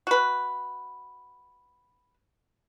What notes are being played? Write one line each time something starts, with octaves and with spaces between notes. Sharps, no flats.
F#4 B4